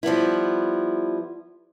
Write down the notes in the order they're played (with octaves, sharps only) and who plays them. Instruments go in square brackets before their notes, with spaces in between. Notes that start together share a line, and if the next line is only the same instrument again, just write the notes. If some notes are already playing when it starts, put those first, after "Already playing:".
[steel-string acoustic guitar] F3 G3 B3 E4